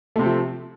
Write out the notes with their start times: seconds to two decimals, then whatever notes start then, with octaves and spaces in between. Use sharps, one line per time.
0.16 A3
0.19 C3
0.22 C4
0.26 F3